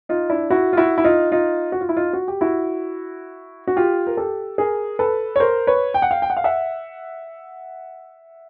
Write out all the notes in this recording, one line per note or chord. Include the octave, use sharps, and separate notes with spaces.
D#4 F4
D4 E4
E4 F#4
F4
E4 F#4
E4
D#4 F4
D#4 F4
F#4
F4
E4
D#4 F4
F#4
G4
E4 F#4
F#4
F4 G4
A#4
G4 A4
G#4 A#4
A4 B4
C#5
A#4 C5
B4 C#5
G5
F#5
F5 G5
G5
F#5
F5
E5 F#5